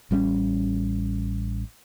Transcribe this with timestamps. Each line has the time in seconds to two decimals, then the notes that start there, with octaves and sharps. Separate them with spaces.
0.11 A1 G3 B3 C#4